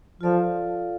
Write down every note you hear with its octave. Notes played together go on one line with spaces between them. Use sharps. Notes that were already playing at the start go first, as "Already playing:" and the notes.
F3 F4 A4 D5 F5